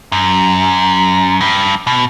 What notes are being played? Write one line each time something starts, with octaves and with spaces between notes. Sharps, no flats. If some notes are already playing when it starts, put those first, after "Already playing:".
F#2
G2
B2